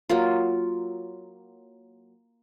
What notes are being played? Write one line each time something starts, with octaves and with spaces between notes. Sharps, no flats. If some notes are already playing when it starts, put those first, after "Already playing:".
F#3 A#3 F4